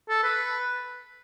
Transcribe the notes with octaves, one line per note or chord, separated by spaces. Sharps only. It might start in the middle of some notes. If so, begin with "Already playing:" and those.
A4
B4